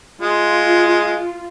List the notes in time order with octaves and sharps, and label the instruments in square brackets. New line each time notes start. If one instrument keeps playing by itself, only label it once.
[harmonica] G#3 [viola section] F4